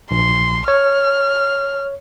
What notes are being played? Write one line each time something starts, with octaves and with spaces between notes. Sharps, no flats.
A#1 C6
C#5 F6